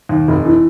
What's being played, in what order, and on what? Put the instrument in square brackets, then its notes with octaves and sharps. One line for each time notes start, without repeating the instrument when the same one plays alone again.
[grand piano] D#2
F1
E3